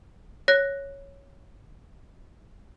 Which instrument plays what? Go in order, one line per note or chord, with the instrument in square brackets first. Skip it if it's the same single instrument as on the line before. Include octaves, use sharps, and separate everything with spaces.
[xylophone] C#5 F#6 A#6